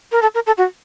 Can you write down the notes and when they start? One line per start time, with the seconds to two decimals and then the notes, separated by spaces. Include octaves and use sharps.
0.12 A#4
0.22 A4
0.35 A#4
0.47 A4
0.58 F#4